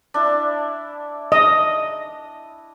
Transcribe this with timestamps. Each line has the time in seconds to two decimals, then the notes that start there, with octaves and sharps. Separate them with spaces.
0.14 D4 E4
1.32 D#5